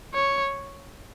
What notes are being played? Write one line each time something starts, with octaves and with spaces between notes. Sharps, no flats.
C#5